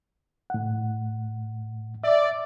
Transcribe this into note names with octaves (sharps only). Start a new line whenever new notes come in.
A2 F#5
D5 E5